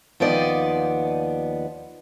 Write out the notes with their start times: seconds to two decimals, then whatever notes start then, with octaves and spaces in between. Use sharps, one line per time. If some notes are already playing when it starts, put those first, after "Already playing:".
0.20 D#2 F3 B3 D5 D#5